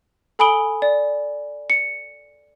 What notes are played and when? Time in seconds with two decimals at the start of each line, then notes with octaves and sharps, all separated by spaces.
0.39 A4 G#5 B5 D#6 D7 G7
0.82 D5
1.70 C#7